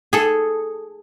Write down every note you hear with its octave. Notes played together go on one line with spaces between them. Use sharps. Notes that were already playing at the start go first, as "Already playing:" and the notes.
G#4 A4